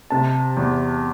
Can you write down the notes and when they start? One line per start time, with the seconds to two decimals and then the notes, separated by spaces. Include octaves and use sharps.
0.10 C3 A5
0.57 E2